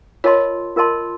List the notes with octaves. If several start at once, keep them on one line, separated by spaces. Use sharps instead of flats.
F4 A#4 C#5 D#5 A5 C6
F4 A#4 D#5 A5 C6